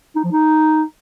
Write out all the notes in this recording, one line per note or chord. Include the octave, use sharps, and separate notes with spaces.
D#4
F3
D#4